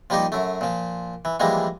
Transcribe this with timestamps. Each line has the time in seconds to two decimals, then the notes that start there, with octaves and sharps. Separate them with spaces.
0.10 F3 G3 A#3 D#4 G4
0.32 F#2 A3
0.61 A#2 F3
1.25 E3
1.40 E3 F3 G3 G#3 A#3